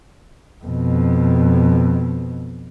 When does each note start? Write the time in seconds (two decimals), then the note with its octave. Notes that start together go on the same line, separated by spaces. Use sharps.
0.64 F2 B2